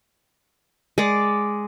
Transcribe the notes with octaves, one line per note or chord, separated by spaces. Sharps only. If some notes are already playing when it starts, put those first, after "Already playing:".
G#3 D5